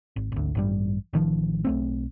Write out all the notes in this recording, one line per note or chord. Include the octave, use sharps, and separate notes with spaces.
G#1
G#1 D2
A1 G2 G3
A1 D#3 F3
B1 A3 C4